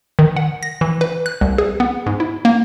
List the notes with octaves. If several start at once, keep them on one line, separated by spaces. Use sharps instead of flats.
D#3
F#5
A#6
E3
B4
F#6
C2
G#4
B3
G#2
E4
A#3